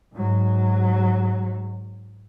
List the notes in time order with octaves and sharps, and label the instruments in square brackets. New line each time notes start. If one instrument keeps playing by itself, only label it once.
[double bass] G#2 F#3